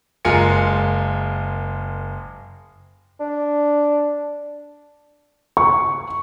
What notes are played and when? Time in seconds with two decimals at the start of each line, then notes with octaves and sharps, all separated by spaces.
0.25 F#1 G#3 F4 A#4 G#5 C#7
3.20 D4
5.57 C#6